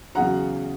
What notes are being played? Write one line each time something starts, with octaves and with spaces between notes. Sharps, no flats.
E2 C#3 F#3 F#5 A#5